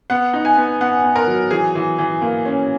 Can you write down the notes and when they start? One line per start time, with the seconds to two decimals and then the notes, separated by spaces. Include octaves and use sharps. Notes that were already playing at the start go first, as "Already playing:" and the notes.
0.10 B3 F#5
0.33 D#4
0.45 G#5
0.57 B3
0.81 B3 F#5
1.04 B3
1.16 A#4
1.27 F#3
1.51 E3 G#4
1.75 E3
1.99 E3
2.22 A#3
2.45 C#4